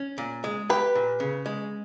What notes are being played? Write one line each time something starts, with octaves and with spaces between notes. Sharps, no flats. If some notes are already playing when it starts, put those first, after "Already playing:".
Already playing: C#4
A#2
G#3
G4 B4
A#2
C#3
G#3